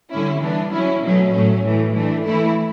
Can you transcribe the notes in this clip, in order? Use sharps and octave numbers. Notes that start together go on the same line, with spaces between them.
D3 G3 C#4 E4
E3 B3 D4
F#3 C#4 E4
B2 F#3 A3 C#4
A2 F#3 A3 C#4
A2 E3 A3
E3 A3 D4
E3 A3 E4